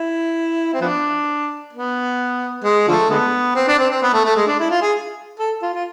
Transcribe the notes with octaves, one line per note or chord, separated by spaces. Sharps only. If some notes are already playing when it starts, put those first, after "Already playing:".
Already playing: E4
C4
F3 B3 D4
B3
G#3
D3 F3 A3
D3 G#3 B3
C4
D4
C4
C4
B3
A3
A3
G#3
D4
E4
F4
G#4
A4
F4
F4